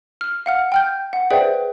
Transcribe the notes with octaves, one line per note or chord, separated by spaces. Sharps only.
F6
F5 F#5 F6
G5 F6 G6
F#5
G#4 B4 C5 D5 E5 G5